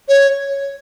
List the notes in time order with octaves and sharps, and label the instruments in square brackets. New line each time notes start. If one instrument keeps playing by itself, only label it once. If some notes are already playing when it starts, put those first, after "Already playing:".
[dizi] C#5